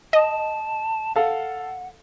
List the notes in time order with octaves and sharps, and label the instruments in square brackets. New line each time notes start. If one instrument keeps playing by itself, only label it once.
[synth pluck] D#5 [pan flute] A5
[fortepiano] A4 F5 [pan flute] F#5